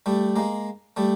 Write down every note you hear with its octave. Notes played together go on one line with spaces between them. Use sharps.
G3 A3
G#3 A#3
G3 A3